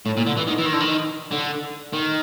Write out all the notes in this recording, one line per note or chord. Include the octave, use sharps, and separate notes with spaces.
A2
A#2
D3
E3
D#3
E3
D#3
D3
D#3
D3
D#3